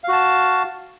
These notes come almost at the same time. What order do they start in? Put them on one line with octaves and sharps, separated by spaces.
F5 F#4 A5